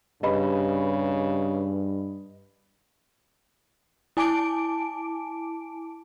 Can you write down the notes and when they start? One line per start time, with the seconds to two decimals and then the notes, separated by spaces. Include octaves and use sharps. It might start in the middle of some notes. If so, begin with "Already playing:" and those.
0.23 G2 C#3 G4 B4 D#5 B5
4.17 E4 G#5 A5 D6 D7